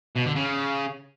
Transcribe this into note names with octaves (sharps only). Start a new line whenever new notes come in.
B2
D3
C#3